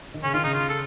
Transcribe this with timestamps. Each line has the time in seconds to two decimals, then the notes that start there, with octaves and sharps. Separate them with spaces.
0.14 D#3
0.23 C#3 C#4
0.33 D#3 F4
0.44 C#3 D#4
0.54 F4
0.69 A4